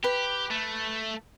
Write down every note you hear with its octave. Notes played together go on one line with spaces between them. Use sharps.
G4 B4
A3